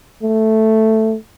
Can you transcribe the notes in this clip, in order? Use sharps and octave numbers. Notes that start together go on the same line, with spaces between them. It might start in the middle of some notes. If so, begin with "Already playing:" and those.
A3